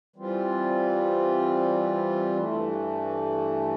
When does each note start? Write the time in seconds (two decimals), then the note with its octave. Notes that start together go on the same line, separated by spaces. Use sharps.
0.16 E3 G3 C4 F4
2.38 G2 E3 A3